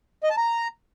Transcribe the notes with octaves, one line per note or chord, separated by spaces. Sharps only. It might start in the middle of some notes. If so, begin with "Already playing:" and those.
D#5
A5
A#5